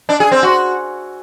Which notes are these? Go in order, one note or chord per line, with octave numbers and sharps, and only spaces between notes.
D4
G#4
C4
F#4